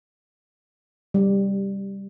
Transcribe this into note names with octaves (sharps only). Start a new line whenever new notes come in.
G3